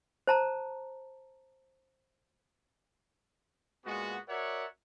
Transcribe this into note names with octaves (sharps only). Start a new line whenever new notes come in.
C5 A5 A#5
A#2 G#3 B3 F#4
F#4 A#4 C#5 D5 E5 F#5